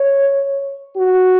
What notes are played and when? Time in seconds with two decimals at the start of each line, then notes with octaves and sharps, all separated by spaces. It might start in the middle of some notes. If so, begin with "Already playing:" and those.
Already playing: C#5
0.96 F#4